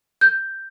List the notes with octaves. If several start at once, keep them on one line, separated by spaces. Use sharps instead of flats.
G6